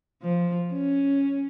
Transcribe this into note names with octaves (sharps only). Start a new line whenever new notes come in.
F3
C#4